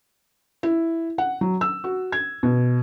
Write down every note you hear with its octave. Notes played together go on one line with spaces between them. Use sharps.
E4
F#5
F#3
E6
F#4
G#6
B2